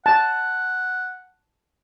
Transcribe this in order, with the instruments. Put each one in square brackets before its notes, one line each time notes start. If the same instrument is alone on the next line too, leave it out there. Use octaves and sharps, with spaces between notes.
[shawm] F#5 [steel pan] A5